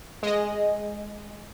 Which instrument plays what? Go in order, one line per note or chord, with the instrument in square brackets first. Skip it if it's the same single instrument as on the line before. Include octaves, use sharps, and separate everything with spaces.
[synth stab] G#3 D#5